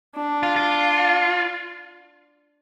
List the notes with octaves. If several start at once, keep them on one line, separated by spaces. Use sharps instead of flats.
D4
F4
F4